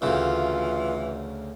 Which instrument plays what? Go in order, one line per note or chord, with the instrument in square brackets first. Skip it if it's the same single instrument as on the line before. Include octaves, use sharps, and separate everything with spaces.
[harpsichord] D2 C#3 [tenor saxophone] E3 [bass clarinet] F4